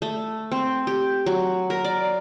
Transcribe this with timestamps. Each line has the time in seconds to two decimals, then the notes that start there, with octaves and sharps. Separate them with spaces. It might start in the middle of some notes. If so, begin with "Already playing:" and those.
0.02 A3
0.52 C4
0.87 G4
1.26 F#3
1.70 A#4
1.84 D5